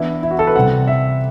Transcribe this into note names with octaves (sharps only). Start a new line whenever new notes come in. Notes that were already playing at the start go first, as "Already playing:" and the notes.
Already playing: E3 B3 D4 E4
E4
F#4
A4
B4
C3 G3 C4 F#5
E5